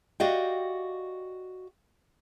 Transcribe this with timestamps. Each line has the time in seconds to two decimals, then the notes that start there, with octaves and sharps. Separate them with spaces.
0.20 F#4 G4 D5 D#5 F5 G5